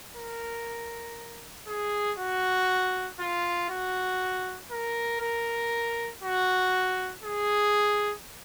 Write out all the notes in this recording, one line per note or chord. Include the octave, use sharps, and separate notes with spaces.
A#4
G#4
F#4
F4
F#4
A#4
A#4
F#4
G#4